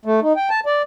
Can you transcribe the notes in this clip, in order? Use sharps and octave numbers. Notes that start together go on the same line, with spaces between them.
A3
D#4
G5
A5
D5